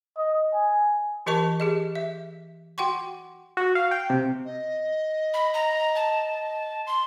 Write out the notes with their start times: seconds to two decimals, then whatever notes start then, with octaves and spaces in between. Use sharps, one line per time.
0.18 D#5
0.54 G#5
1.26 E3 G4 A#4 D#5 A5 C#6
1.60 G4 G#4 D#5
1.95 E5
2.78 F#4 F#5 G5 C6 C#6
3.57 F#4
3.75 F5
3.91 G5
4.10 C3
4.45 D#5
5.34 B5
5.54 A#5
5.95 A5
6.87 C6